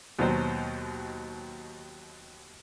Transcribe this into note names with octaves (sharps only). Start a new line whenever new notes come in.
D#2 B2 F#3 C5